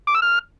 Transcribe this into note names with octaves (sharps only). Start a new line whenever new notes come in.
D6
E6
F6